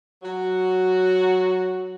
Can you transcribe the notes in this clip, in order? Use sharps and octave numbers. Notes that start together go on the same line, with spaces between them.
F#3 F#4